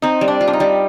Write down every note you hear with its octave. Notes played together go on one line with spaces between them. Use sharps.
C4 D#4
G3
D4
F4
D4
D#4
G3